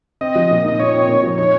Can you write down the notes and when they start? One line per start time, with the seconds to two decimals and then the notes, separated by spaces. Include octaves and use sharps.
0.21 C4 D#5
0.35 F3
0.51 A#2
0.65 D#4 D#5
0.80 D#4 C#5
0.94 C4
1.09 A#2
1.23 F3
1.38 D#4 C#5